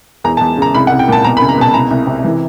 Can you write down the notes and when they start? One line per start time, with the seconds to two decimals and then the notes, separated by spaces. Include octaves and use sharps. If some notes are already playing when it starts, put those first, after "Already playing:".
0.24 E2 A#5
0.37 A5
0.41 E2
0.58 C#3 A#5
0.75 C2 B5
0.87 F#5
0.92 C2
0.99 G5
1.08 A#2 A5
1.24 B2 A#5
1.37 B5
1.42 C#2
1.49 A#5
1.58 B2 A5
1.74 C2 A#5
1.91 C2
2.07 C3
2.24 E3